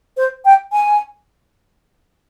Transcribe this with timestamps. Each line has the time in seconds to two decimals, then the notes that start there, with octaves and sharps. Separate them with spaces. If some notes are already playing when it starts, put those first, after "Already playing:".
0.17 C5
0.45 G5
0.72 G#5